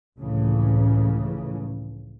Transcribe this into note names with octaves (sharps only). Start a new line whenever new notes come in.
F1 C#2 A2 C#3 E3